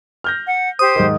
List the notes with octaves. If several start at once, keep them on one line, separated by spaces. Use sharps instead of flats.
F6 G6 A#6
F#5
G4 C5 D#6
G#2 D#3